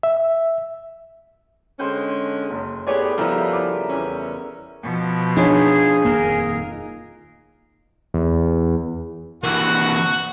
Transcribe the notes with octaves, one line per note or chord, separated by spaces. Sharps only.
E5
D3 G#3 C#4 C5 G5
F#1
A2 B3 G4 G#4 C#5 D5
C#3 F3 G3 B3 E4 A#4 E5 A#5
D6
E2 C#4
B2 F3
D4 D#4 F4 G#4 C#5
D#1 F2 A#3 A#4
E2
E3 A#3 F#4 F#5